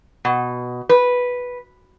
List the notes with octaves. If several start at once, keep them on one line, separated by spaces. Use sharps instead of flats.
B2
B4